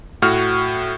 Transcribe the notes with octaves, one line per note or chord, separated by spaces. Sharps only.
A2 F#4 F6